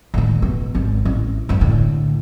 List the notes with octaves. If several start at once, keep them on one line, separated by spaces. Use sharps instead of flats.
A2 D#3
B2
G#1
A1
G#2 D#3
A2 D3